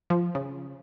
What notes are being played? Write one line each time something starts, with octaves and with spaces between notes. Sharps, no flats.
F3
C#3